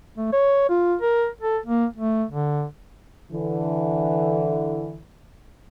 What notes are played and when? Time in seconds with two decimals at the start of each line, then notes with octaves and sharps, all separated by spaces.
0.17 A3
0.33 C#5
0.70 F4
1.02 A#4
1.41 A4
1.66 A#3
1.96 A3
2.30 D3
3.32 D3 E3